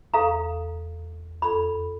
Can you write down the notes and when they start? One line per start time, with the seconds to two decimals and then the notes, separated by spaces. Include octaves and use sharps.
0.14 E2 A4 F5 A#5
1.42 F2 A4 B5